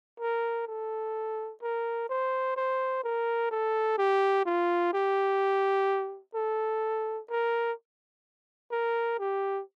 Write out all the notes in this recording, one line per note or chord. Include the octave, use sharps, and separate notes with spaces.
A#4
A4
A#4
C5
C5
A#4
A4
G4
F4
G4
A4
A#4
A#4
G4